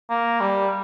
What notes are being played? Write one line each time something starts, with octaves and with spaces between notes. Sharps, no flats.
A#3
G3